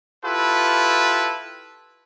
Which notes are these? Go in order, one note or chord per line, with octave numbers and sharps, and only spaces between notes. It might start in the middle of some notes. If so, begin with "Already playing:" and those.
E4 F4 G4 A4 B4